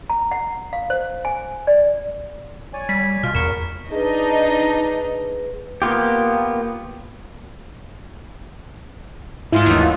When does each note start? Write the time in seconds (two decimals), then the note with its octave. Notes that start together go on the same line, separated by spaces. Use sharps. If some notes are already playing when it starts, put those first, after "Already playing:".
0.10 A#5
0.31 F#5
0.73 F5
0.90 C5
1.25 G#5
1.67 D5
2.73 C#5 D5 G#5
2.89 G3 B6
3.23 B2 F4 F6
3.35 E2 A#4 B5 C#6 F6 C#7 E7
3.91 D4 D#4 G#4 B4 D#5
5.82 A#3 B3 F4 G4
9.52 G#2 G#3 E4 F4
9.66 D#2 E3 F#3 A3 D#4